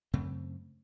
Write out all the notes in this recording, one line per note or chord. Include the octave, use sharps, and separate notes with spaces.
F#2 C#3 A3 C4